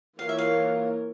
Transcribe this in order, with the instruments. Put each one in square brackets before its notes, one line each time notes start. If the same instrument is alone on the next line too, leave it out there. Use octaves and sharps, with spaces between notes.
[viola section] E3 A#3 F4 A#4 C#5 [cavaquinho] F5
[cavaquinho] E5
F5